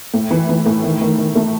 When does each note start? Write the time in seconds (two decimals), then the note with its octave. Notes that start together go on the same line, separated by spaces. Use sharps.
0.14 A2
0.31 E3
0.49 E3
0.66 A2
0.84 D#3
1.01 D#3
1.18 D#3
1.35 A3